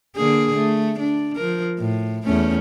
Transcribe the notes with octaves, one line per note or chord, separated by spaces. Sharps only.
D3 A#3 G#4
A3
D4
F3 A#4
A2
E2 A3 C#4